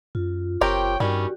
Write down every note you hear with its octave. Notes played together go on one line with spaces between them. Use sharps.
F#2 F4
F#1 C4 G4 A#4 C#5 G5
G2 D#3 G3 C#4 F#4 G4